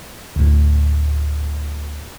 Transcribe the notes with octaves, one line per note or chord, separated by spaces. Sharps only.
D2 A2